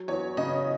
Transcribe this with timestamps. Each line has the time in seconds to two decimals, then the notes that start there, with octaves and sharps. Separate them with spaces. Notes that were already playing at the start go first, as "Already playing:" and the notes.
Already playing: F#3
0.08 E2 C#5
0.37 C#3 D#5